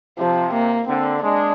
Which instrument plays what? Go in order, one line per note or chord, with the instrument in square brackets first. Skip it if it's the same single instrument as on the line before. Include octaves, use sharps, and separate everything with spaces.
[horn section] C3 [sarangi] F3
[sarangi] A#3
[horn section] D3 [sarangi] C4
[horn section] G#3 [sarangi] D4